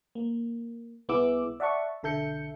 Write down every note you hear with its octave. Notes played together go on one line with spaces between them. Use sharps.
A#3
C2 B3 E4 G#4 D6 E6
D5 E5 F#5 A5 C#6
B1 D3 A4 E5 G6 C#7